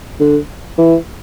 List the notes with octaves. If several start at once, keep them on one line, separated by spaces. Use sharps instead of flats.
D3
E3